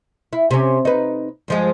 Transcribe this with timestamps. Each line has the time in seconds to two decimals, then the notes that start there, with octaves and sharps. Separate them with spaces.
0.33 E4
0.51 C3 C#4
0.85 D#4 B4
1.48 G2 F3 G#3